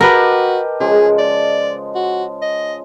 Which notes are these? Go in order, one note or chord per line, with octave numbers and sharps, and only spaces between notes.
F#4 G4 A#4 B4 D#5 A5
C#3 F3 G#3 G#4
D5
F#4
D#5